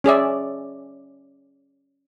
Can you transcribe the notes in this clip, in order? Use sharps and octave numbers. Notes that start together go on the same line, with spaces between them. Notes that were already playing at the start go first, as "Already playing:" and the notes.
C#4 G#4 D5 E5